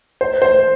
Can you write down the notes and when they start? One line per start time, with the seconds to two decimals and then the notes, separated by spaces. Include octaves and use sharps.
0.21 C5
0.42 C5